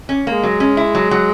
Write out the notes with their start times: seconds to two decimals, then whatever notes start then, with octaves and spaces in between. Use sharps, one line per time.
0.09 C#4
0.26 G#3 A#3
0.43 F#3
0.60 C#4
0.77 E4
0.95 F#3
1.11 F#3